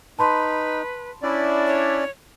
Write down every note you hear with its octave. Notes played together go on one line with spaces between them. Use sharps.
D#4 B4 A5 B5 C6
C#4 D4 E4 D5
C#5